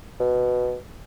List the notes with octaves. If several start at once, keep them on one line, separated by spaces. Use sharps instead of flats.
B2